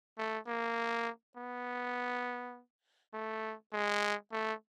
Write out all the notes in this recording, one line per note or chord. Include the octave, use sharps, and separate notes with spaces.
A3
A#3
B3
A3
G#3
A3